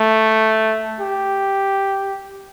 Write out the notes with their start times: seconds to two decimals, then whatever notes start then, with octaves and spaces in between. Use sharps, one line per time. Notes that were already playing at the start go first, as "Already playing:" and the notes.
Already playing: A3
1.01 G4